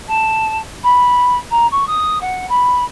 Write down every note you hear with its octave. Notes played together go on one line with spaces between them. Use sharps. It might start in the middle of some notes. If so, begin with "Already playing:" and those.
A5
B5
A#5
C#6
D#6
F#5
B5